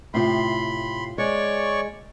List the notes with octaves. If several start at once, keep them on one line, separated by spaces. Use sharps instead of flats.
A2 C3 F4 B5 C6
G#3 C#5 D5 C#6